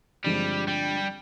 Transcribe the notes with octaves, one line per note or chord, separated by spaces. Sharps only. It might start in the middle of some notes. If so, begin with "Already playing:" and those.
G2 D3 F3 G3 G#3 C4
G3